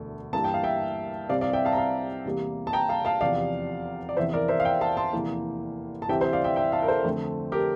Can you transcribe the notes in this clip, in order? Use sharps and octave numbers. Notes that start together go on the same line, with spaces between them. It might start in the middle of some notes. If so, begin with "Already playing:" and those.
Already playing: E1 D2 D3 A3
G2 E3 A#3 A5
G5
F5
E5 G5
C2 C3 G3 C4 D5 F5
D5 F5
E5 G5
F5 A5
A#5
F5 A5
E2 C3 G3 A#3
A5
G5 A#5
F5 A5
F5 A5
F1 E2 C3 F3 D5 F5
D5
F1 E2 E3 C5 E5
A#4 D5
C5 E5
F5
E5 G5
F5 A5
A5 C6
F1 E2 E3 A#3
A5
D2 C3 E3 G3 C4 E5 G5
C5 E5
D5 F5
E5 G5
E5 G5
F5 A5
A#4
A4 C5
F2 D3 A3 C4
G4 A#4